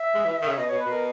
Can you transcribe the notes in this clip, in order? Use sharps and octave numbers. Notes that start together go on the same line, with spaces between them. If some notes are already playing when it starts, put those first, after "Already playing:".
Already playing: E5
G#3
E3
D#3
C#3
B2 D#5
B2 C#5
B4
B2 A#4